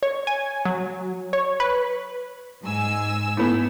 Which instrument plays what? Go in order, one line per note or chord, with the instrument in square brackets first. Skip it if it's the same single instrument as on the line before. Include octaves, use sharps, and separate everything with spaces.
[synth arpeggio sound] C#5
G#5
F#3
C#5
B4
[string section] G#2 G#5 E6
[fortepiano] A2 B3